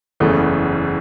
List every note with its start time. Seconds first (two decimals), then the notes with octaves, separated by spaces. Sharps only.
0.20 F#1 E2 C#3 A3